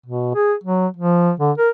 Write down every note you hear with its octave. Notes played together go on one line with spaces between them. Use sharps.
B2
G#4
F#3
F3
D3
A#4